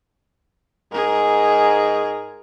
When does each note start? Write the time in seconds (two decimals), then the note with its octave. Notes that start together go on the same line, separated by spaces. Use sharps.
0.92 G#2 G#4 A#4